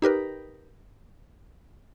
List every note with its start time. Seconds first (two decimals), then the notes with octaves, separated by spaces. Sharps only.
0.02 D#4 G4 A#4 B4